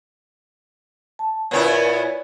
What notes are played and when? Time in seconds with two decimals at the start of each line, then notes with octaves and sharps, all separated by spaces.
1.19 A5
1.51 A#2 B3 E4 C#5 D5 G#5